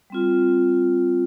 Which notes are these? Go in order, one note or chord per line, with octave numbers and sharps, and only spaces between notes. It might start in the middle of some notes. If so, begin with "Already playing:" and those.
G3 C4 F4